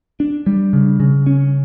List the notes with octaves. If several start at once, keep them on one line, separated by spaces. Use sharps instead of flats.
D4
G3
C#3
C#3
C#4